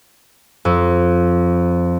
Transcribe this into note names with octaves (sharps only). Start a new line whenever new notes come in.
F2